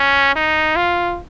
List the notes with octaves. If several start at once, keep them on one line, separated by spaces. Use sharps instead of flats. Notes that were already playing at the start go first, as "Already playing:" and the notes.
Already playing: C#4
D#4
F4